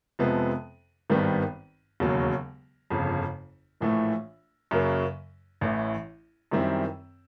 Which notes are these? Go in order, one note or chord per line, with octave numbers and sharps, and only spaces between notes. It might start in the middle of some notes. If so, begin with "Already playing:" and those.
F2 C3 F3 G#3 B3
G#1 G2 D#3 G3 B3
E1 D#2 C#3 F#3
G1 F2 C#3
A#1 A2 E3 A3
F#2 C#3 F#3 A#3
A1 A2 E3
F#2 D#3 G3 C4 E4